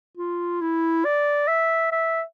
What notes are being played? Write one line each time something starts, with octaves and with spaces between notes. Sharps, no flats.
F4
E4
D5
E5
E5